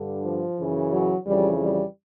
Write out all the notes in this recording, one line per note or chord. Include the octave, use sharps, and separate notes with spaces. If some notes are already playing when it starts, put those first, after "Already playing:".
Already playing: G2 D3
F3
F#2 C#3 E3
F#3
F2 C#3 E3 G3
G3